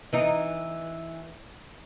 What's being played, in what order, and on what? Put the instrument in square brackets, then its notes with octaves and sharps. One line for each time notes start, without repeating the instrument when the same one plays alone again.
[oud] E3 D#4